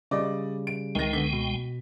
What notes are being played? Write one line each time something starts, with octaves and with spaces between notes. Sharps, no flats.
C#3 G3 D5 D#5 D6
D7
C#2 D#3 G#3 G5 A#6
D3 B3 B6
B2